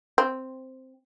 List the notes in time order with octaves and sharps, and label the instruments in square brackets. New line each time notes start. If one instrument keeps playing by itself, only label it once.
[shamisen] C4